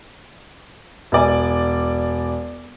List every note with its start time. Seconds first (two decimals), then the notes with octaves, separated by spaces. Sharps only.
1.12 E1 D5 G#5